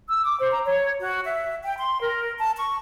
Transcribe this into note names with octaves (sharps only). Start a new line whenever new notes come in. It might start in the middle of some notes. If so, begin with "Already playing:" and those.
E6
D6
C5
A#5
C#5
F#4
E5
G5
C6
A#4
A5
C#6